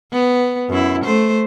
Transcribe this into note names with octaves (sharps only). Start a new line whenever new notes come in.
B3
F#2 E4
A3 C5